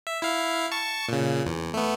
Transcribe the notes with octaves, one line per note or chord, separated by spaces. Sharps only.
E5
E4 F5
A5 C#6
A#2 C#3
E2
A3 B3